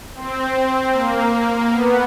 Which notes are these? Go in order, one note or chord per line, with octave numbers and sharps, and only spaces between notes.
C4
A#3
B3